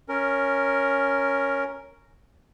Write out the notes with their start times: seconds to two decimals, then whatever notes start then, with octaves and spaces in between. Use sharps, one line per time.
0.09 C#4 A#4